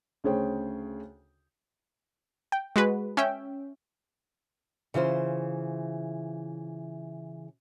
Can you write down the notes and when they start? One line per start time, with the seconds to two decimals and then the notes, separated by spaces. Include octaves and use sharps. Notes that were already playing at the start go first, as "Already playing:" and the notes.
0.24 D2 C#3 G#4 C5 C#5 G5
2.52 G5
2.76 G#3 F#4 B4
3.17 C#4 E5 G5
4.94 C#3 E3 F4 C5